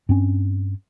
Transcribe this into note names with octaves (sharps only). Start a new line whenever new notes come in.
G2 C4 C#4